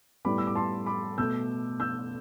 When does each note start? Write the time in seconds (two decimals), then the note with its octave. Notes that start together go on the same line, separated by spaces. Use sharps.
0.25 A2 G3 B3 B5 D6
0.38 E6
0.47 D6
0.55 A5 C6
0.86 B5 D6
1.18 B2 A3 E6 G6
1.80 E6 G6